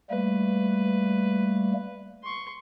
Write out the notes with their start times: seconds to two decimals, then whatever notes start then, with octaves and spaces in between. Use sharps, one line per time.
0.10 G3 A3 A#3 B4
2.23 C6 C#6